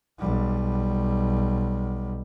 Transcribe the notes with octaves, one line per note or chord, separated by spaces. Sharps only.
B1 G3